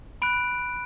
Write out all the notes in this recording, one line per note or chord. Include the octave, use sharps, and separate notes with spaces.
B5 F#6 D7